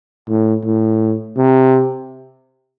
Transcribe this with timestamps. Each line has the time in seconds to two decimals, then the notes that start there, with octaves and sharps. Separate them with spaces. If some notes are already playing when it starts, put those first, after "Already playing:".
0.29 A2
0.64 A2
1.37 C3